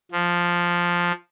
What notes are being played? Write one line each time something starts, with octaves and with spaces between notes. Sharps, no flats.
F3